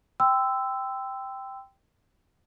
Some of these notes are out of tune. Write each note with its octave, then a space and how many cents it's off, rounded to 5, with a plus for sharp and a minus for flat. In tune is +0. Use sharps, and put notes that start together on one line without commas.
G5 +0 C6 -30 E6 +0